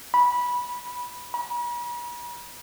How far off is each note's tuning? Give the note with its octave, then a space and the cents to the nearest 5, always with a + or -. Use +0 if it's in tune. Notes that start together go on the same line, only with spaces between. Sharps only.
B5 -15
B5 -45